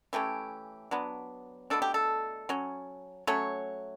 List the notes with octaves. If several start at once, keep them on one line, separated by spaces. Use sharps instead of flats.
E3 A3 C#4 G4
F#3 B3 D4
B2 F#3 A3 D4 A4
G4
A4
F#3 C#4
F#3 A3 C#4 C#5